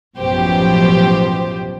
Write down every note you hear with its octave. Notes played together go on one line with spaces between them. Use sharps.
A1 F#2 B2 F3 G4 C5